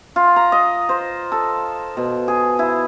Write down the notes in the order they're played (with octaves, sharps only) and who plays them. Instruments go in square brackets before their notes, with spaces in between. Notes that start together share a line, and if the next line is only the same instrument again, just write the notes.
[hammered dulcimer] F4
A#5
D#5
C5
A4
B2
G#4
E4